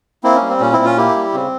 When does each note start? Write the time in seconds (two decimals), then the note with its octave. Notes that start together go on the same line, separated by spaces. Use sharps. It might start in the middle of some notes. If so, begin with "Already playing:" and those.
0.24 A#3 C4 E4
0.36 C#4
0.42 G3
0.49 C4
0.61 A#2 C#4
0.73 C4 E4
0.79 A#2
0.85 C#4 F4
0.97 A#3 E4 G4
1.16 G3
1.34 C#3 C4